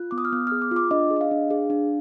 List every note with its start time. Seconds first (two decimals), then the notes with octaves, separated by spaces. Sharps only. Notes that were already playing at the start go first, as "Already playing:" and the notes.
Already playing: F4 F#6
0.11 B3 D6
0.18 D#6
0.25 F6
0.32 B3 F#6
0.47 G#4 F6
0.62 D6
0.71 F4
0.76 D6
0.91 D4 D#5
1.11 G#4
1.16 D#5
1.21 F5
1.31 D4
1.51 G#4
1.70 D4